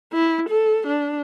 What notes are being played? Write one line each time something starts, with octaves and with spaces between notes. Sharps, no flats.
E4
A4
D4